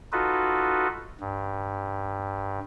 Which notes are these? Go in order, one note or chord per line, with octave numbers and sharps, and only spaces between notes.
D#4 F4 F#4 A4 B4
G2